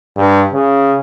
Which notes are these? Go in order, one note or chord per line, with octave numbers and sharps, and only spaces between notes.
G2
C#3